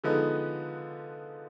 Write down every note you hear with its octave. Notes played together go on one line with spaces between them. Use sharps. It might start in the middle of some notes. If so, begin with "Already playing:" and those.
D3 F3 G#3 B3 D#4